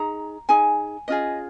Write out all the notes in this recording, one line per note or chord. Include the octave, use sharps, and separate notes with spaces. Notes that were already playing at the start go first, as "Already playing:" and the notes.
Already playing: D#4 G#4 A#5
D#4 G#4 G#5
C#4 F4 G#4 D#5